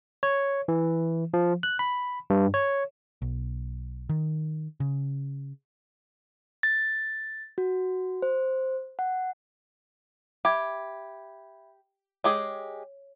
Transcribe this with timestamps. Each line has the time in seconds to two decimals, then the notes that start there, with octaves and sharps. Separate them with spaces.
0.23 C#5
0.68 E3
1.34 F3
1.63 F#6
1.79 B5
2.30 G2
2.54 C#5
3.22 B1
4.09 D#3
4.80 C#3
6.63 A6
7.58 F#4
8.22 C5
8.99 F#5
10.45 G4 E5 B5 G#6
12.24 G#3 G4 G#4 C#5